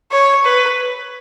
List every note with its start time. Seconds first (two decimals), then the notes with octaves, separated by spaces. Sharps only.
0.12 C#5
0.44 B4